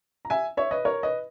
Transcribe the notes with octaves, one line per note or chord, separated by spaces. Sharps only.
A#5
E5 G#5
C#5 E5
B4 D#5
A#4 C#5
B4 D#5